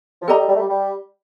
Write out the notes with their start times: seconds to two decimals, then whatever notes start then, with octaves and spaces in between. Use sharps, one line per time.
0.22 F3
0.28 G3 A4 D#5 A#5
0.38 G3
0.49 G3
0.55 A3
0.59 G3
0.69 G3